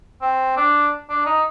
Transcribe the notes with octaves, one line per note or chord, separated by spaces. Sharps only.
C4
D4
D4
D#4